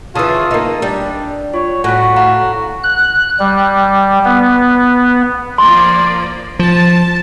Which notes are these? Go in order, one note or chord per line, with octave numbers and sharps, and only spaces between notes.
C#3 E3 F4 A5 D#6 E6
A#3 D#4
G3 D4
F4 C#5
A2 F#4 G#5 F#6 B6
F5 F#5 A#5
F#6
G3
B3
F3 A#3 D5 C6
F3 A5